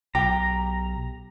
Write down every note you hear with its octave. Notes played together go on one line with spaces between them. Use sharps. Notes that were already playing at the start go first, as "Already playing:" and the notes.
B1 G4 A#5